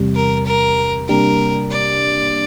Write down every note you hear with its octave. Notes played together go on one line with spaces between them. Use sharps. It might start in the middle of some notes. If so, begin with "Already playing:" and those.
Already playing: E2 C3 G3
A#4
A#4
C3 G3 A#3 D4 G4 A#4
D5